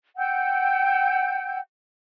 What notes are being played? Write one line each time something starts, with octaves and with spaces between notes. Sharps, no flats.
F#5 G5 E6 G6